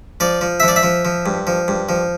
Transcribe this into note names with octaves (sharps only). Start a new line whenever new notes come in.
F3 D5
F3
E5
F3
D5
E5
F3
F3
G2
F3
G2
F3